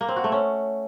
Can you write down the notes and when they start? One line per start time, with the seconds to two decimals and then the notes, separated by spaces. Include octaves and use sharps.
0.01 A#3
0.08 C4
0.16 F#4
0.24 A3
0.32 C#4